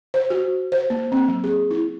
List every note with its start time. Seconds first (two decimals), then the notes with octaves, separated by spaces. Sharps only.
0.14 C5
0.30 F#4
0.72 C5
0.90 A#3
1.12 C4
1.28 F#3
1.44 G#4
1.71 E4